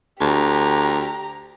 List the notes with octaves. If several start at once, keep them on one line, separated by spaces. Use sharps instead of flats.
D2 G4 A#5